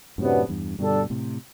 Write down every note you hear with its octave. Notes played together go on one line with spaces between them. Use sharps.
F#2 A2 C3 F#3 B3 D4
E2 G2
G2 B2 D3 G3 D4 A4
A2 C3